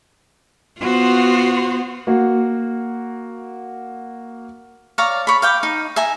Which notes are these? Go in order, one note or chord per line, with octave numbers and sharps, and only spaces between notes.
B3 F4 F#4 C5
A#3 F#4
C#5 D5 F5 A#5
C#5 B5
F5 G5 D6
D#4
E5 G#5 A#5